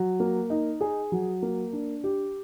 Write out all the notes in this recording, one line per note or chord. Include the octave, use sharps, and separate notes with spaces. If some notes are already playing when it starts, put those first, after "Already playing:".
Already playing: F#3
A#3
D#4
G#4
F#3
A#3
D4
G4